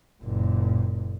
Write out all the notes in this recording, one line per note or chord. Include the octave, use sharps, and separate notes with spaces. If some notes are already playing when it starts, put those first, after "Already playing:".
F#1 A#2